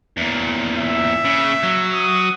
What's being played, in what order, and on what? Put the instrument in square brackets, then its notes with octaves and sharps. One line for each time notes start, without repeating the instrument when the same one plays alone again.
[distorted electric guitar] E2 A#2
[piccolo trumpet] E5
[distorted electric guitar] C#3
F#3
[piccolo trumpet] D#6